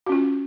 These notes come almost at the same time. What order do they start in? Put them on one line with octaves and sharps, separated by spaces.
F#4 C#4 F4